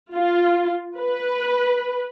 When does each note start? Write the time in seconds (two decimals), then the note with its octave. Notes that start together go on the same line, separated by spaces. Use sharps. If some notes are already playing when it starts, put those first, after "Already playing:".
0.14 F4
0.99 B4